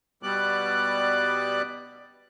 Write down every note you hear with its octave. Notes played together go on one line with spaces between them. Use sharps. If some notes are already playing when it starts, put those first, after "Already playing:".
B2 G3 B3 D5 F#6